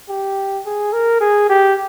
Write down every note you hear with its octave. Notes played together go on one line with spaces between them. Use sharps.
G4
G#4
A#4
G#4
G4